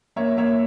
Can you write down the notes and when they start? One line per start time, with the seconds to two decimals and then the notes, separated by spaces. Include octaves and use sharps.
0.16 A#3 C#5 E5
0.37 A#3 C#5 E5